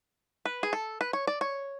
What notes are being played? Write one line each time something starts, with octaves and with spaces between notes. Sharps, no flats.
B4
G#4
A4
B4
C#5
D5
C#5